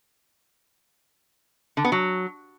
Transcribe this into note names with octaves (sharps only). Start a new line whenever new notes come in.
D3
B3
F#3